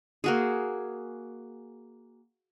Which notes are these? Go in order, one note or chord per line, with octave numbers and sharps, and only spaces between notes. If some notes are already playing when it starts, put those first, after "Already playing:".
A#3 F#4 G#4